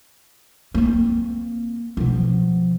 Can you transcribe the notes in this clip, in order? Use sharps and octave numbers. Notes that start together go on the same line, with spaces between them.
A#3 C4
B2 F3